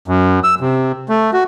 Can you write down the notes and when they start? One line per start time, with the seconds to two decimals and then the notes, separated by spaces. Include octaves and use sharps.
0.08 F#2
0.44 E6
0.61 C3
1.09 A3
1.33 F#4